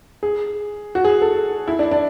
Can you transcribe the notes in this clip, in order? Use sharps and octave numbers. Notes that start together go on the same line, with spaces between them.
G#4
F#4
G#4
A4
E4
D4
D4